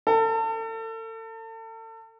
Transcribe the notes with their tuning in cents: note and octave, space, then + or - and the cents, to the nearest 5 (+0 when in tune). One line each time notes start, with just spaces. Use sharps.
A4 +35